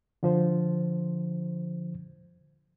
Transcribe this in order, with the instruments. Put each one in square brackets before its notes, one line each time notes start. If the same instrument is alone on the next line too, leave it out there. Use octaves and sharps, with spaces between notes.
[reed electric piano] D3 F3 C5